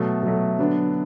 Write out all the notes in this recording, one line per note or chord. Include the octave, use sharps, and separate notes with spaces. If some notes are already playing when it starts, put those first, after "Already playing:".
Already playing: B2 F#3 A3
B2 F#3 A3
D3 F#3 B3 D4